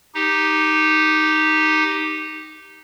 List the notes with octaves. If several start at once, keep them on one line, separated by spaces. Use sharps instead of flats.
D#4 G4